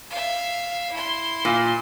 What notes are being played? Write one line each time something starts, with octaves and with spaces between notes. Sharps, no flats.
E5 F5
E4 C6
A#2